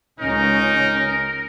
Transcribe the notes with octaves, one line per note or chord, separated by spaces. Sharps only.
C#2 C#4 D#4 A#4